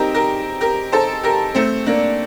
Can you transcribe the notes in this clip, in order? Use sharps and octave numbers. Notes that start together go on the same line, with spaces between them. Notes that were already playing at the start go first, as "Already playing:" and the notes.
Already playing: C4 D#4 G4 A#4
G4 A#4
G4 A#4
A4 C5
G4 A#4
A3 C4
A#3 D4